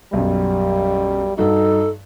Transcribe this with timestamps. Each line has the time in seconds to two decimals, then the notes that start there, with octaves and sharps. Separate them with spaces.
0.13 B1 F#2 G3
1.38 G2 D#4 F#4 A4